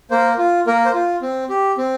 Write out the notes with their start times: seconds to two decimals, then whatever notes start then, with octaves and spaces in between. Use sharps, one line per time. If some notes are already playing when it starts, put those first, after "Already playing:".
0.11 A#3 C5
0.38 F4
0.67 A#3 A#4
0.86 C5
0.94 F4
1.22 C4
1.49 G4
1.78 C4